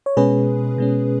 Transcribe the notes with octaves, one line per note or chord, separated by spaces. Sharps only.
C#5
B2 G#3 C#4 G#4 B4
B2 G#3 C#4